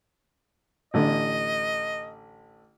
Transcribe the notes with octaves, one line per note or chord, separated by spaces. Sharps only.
A1 D3 D#5